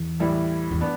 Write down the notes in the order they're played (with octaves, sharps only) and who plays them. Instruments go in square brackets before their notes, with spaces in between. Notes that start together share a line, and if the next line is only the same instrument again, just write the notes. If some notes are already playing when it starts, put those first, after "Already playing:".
Already playing: [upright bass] E2
[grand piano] A2 E3 G3 E4
[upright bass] E2
[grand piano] B3 D4